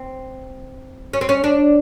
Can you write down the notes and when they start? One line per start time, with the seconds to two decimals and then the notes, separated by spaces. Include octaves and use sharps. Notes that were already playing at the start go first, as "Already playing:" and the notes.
Already playing: C4
1.13 C#4
1.21 C4
1.29 C#4
1.44 D4